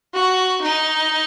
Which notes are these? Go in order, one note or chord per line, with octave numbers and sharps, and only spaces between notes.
F#4
D#4